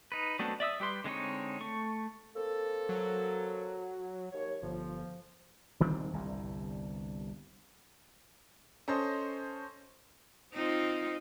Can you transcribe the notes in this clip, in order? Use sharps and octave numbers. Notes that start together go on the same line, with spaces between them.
D#4 B4
F#3 A3 B3 C4 D4
D5 E5 D#6 E6
G3 G4 B4 C6
D3 G#3 C4 D#4 C#5
A3 C#6
A#3 C4 A4
F#3
D#2 C#5
G1 F3
D#1 D#3 G3 C4
G1 C2 G2
C#4 A4 C5 D#5 A#6
C4 D#4 F4